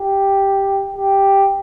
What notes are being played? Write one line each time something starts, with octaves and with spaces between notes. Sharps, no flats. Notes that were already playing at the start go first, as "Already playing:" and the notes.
Already playing: G4
G4